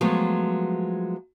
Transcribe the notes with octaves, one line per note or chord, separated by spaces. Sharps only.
F3 F#3 G#3 A3 B3